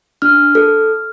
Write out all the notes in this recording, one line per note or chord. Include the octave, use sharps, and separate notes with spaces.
D4 F6
A4